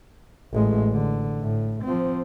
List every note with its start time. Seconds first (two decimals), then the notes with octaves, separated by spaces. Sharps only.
0.52 A1 G#3
0.92 D3
1.40 A2
1.83 F3 C4